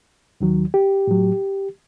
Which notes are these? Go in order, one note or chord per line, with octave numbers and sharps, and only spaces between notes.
D#2 D#3 F#3
G4
A2 F#3